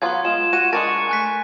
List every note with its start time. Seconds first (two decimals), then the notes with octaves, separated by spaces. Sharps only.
0.02 F#3 B3 F4 C6 G#6
0.25 G#3 F4 E7
0.53 F#4 D#7
0.73 G#3 D4 A#4 C#6 A6
1.09 A3 G#5 F#6 B6